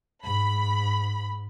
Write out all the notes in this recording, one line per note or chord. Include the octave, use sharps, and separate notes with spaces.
G#2 B5